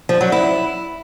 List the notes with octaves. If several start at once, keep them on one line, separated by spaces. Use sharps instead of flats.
F3
F#3
E4